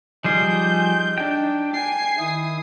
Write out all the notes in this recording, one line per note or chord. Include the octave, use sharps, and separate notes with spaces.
F3 G3 D#4 G#4 G6
D4 G5
G#5 C7
D#3 E4 D#6